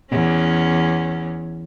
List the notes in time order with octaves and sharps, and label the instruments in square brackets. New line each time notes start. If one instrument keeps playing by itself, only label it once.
[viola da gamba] E2 C#4